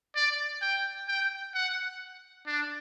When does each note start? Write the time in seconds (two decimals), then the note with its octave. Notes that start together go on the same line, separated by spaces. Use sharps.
0.15 D5
0.62 G5
1.08 G5
1.54 F#5
2.47 D4